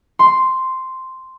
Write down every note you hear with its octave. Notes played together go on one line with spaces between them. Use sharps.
C6